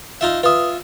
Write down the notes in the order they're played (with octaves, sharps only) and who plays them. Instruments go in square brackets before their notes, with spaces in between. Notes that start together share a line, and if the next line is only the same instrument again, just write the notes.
[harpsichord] D#4 F4 E5
[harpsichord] F4 E5 [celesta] B4 D#6